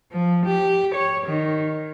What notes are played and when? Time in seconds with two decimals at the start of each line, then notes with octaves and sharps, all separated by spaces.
0.12 F3
0.46 G4
0.94 C#5
1.26 D#3